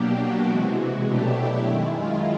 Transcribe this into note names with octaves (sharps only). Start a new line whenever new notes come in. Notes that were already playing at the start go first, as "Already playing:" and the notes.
Already playing: B2 F#3 A#3 D4 G4
F#4
C3 E3 G#3
B2 F#3 A3 D4 G4
E4
F#2 D#3 G#3 E4
F4